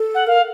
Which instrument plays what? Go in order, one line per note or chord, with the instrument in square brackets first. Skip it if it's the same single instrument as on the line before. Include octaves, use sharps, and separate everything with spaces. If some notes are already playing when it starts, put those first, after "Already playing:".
Already playing: [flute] A4
[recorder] F#5
[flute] A#4 [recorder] F5